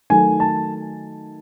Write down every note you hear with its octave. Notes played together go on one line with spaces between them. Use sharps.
D#3 F#3 A3 G#5
A5